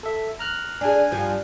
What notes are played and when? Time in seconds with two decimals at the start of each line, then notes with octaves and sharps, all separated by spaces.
0.03 A4 E5
0.39 A#5 F6 F#6
0.81 D4 G#4 G#5
1.11 G2 F3 G3